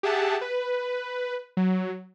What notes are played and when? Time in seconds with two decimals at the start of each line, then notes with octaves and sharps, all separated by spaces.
0.03 G4 G#4 E5 F#5 A5
0.41 B4
1.57 F#3